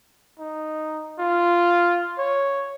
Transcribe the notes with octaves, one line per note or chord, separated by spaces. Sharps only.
D#4
F4
C#5